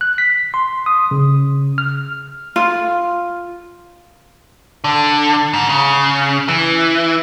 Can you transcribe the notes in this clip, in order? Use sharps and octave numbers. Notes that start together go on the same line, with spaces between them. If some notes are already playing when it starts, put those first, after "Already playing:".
F#6
B6
C6
D#6
C#3
F6
F4
D3
G#2
C#3
E3